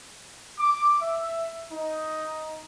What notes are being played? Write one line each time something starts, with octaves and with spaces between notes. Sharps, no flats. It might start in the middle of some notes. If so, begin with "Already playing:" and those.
D6
E5
D#4